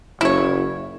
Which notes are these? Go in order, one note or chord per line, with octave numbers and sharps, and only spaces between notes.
F#1 E4 C#5